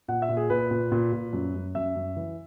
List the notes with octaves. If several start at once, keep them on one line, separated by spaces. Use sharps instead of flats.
A#2 F#5
E5
A#2
G#4
A#2 B4
A#2
A#2
A#2
F#2
F#2
F#2 E5
F#2
E3